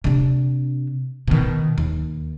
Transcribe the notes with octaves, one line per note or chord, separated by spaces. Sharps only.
C3 D4
B2 D#3
D#2